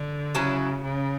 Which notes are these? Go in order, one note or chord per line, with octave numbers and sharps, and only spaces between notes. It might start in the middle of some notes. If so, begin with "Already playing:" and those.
Already playing: D3
C#3 F#3 C#4 E4 B4
C#3